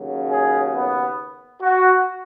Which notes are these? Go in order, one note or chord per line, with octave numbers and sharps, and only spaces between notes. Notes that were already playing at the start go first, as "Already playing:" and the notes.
Already playing: D#2 C#3 F#3
G#4
B3
F#4